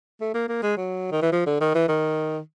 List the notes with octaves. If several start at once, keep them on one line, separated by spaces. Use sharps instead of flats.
A3
A#3
A#3
G#3
F#3
D#3
E3
F3
D3
D#3
E3
D#3